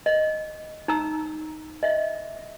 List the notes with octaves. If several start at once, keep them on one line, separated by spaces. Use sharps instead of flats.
D#5
D#4 A#5 E6
D#5 E5